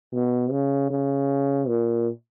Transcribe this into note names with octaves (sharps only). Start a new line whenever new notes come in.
B2
C#3
C#3
A#2